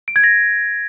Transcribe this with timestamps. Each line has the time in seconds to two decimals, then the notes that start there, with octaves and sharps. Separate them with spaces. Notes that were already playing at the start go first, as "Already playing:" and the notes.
0.08 D7
0.16 G#6
0.24 A#6